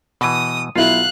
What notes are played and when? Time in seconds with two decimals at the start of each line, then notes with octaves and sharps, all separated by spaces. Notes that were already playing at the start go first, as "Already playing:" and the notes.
0.21 B2 E3 D#6
0.76 B1 E4 F4 F5 F#6